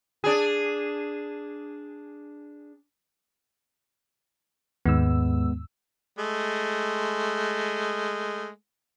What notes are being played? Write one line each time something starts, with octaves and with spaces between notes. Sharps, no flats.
D4 G#4
D#2 G#2 G#3 B3 E6
G#3 A3